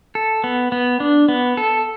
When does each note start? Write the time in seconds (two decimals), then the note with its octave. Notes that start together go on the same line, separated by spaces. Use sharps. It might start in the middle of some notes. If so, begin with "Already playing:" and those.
0.15 A4
0.44 B3
0.72 B3
1.00 D4
1.29 B3
1.57 A4